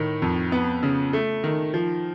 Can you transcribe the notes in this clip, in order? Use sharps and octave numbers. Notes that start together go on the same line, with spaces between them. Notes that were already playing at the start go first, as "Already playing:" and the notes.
Already playing: A2 D#3
F2
B3
C#3
A3
D#3
F3